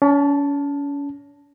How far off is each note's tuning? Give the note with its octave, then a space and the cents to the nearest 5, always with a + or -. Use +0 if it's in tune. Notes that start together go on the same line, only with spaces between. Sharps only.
C#4 +35 A5 +0